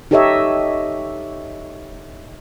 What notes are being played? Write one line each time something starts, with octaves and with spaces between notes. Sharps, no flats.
D#4 G4 A4 C#5 D#5 E5